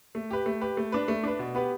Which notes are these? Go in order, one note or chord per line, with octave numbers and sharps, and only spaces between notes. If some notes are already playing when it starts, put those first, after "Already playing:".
A3
G4 B4
A3
G4 B4
A3
D4 B4
A3
D4 B4
B2
B3 G4 B4